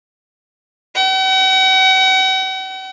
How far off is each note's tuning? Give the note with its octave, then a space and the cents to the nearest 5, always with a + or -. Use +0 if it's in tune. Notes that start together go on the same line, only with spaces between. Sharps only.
F#5 +45